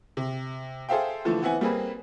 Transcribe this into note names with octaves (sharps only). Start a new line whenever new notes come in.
C3
G#4 A4 C5 E5 F5 G5
D3 E3 F3 A3
E3 B3 C4 E4 F#5 G#5
G3 A#3 C4 G#4 B4